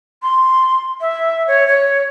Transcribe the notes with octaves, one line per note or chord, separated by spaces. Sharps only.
C6
E5
C#5
C#5